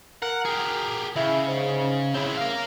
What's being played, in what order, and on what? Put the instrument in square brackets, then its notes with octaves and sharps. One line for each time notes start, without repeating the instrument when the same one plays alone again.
[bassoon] A#4 [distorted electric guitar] F#5
[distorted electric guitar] G4 G#4
[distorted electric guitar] C#3 [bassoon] E4
[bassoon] G#2
[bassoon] C#3 [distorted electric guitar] C4 E4
[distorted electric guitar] A#4 F5